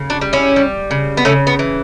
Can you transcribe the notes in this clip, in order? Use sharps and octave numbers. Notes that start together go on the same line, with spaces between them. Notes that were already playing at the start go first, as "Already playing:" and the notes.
Already playing: C#3
D4 F#4
G3
C#4 E4
G3
C#3
B3
C#3 A3 C#4
B3
E3